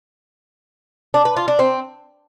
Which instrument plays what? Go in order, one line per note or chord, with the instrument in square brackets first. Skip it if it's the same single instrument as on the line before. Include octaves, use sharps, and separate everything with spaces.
[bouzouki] D4
B4
F4
D4
C4